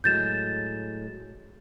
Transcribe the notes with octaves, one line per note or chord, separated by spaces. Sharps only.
A2 F#3 G#3 G6 A6 E7